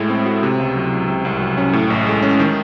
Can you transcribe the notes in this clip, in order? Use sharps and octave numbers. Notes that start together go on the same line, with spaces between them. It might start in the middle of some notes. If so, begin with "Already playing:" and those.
Already playing: A2 G#3 E4
C4
F#4
C3
C#2
F#3
C#2
C3
C2
F#3
C#4
A2
A1
G#3
C#4
D#3